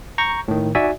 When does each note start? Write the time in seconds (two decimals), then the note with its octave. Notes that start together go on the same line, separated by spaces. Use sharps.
0.18 A#5 C#6 G6
0.48 A2 D#3
0.75 D#4 F#4 D5 E5 G#5